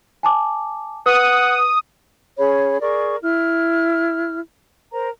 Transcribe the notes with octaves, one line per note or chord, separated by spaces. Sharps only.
G#5 A5 D6
B4 F#5 D#6
C#4 G#4 C#5 B5
G#4 A#4 D5 C#6
E4 F6
A#4 C5 A#5